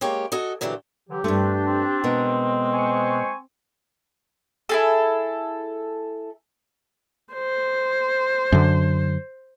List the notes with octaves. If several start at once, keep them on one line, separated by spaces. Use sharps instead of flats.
G#3 A#3 G4 C#5
F#4 A4 D#5 G#5
A#2 D3 E3 F#3 G4
D3 E3 F#3 G4
G2 A3 C4 D4
C4
B2 G#3 B3 A#4
C5 G#5 C#6
E4 G#4 A4
C5
F#2 D3